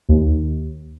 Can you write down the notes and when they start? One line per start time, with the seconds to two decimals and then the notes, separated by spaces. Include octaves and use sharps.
0.09 D#2